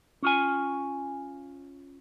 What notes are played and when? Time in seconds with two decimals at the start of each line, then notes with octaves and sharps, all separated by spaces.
0.23 C#4 F4 G#5